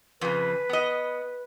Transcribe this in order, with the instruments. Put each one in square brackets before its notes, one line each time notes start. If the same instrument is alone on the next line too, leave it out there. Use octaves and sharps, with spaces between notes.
[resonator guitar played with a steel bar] F2 C#3 [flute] B4
[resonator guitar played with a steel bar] B3 D#5